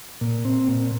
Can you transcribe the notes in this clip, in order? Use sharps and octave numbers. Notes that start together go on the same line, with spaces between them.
A#2
C4
A#2